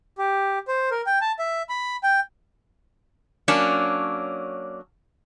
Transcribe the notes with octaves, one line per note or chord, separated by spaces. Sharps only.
G4
C5
A#4
G5
A5
E5
B5
G5
F#3 A#3 C#4 D4